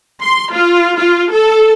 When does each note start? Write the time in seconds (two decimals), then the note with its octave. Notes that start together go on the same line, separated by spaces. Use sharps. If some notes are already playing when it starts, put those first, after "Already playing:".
0.22 C6
0.53 F4
0.99 F4
1.33 A4